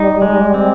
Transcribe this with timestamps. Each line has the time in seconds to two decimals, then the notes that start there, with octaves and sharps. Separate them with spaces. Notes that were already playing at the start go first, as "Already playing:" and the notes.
Already playing: G3 D#4
0.22 G#3
0.54 C4